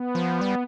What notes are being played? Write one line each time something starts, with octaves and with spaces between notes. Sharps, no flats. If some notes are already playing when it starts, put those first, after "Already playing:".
Already playing: B3
F3
G3